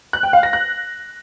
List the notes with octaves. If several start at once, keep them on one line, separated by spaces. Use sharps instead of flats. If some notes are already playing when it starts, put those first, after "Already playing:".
F#6
G5
F5
A#6
F#6